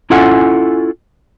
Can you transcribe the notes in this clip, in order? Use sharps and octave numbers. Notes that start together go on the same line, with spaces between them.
C#4 E4 F4 A4 F#5 G#5